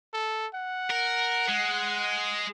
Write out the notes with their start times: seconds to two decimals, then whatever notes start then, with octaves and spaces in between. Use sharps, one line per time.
0.13 A4
0.55 F#5
0.90 A#4
1.48 G#3